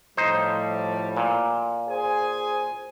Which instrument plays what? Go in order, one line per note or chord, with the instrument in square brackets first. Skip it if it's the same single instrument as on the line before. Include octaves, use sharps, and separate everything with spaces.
[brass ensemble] A2 F3 G3 [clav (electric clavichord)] D#4 C5
[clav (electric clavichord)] A#2
[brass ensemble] G#4 C5 G#5